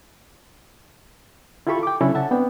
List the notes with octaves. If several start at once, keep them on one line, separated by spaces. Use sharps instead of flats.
E4 F4 G4 A4 B5 C#6
G5 D6
C#3 F#3 C#4 D4 E4 A4
E5 F#5 A5
B3 C4 D4 G5